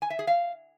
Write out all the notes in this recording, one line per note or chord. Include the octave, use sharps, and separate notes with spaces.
G#5
E5
G#4
F5